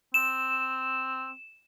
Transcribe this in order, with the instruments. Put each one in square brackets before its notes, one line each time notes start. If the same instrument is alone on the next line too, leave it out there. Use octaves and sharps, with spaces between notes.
[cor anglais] C4 [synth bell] E7